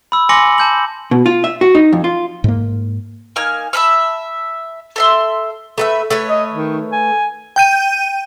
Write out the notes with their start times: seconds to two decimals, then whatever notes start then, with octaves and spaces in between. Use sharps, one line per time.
0.12 B5 E6
0.29 G#5 C6 D6 A#6 C#7 F#7
0.58 A5 G6 F#7
1.11 B2
1.26 F4
1.44 E5
1.61 F#4
1.75 D#4
1.93 F2
2.04 F4
2.44 G#2 A#3
3.36 A#3 D#4 G#5 F6
3.73 E5 A5 B5 F6
4.96 A4 E5 C6
5.78 A3 B4 E5
6.10 A3 B4 C#5
6.30 D#5
6.52 D#3
6.92 G#5
7.56 G5 G6 D#7